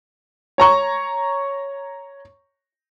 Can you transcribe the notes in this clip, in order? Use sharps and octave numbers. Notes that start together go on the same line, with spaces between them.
C#5 A#5 C#6